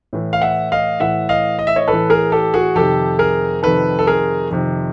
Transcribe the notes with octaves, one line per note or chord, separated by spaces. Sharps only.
A2 E3
F5
E5 F#5
D#5 F5
A2 E3 E5 F#5
D#5 F5
D#5
E5
C#5 D#5
A2 E3 A4 B4
G#4 A#4
G4 A4
F#4 G#4
F2 C3 D#3 G4 A4
G#4 A#4
F2 C3 D#3 A4 B4
A4
G#4 A#4
F2 C3 D#3